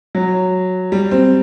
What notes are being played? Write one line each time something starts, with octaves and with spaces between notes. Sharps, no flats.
F#3
G3
C4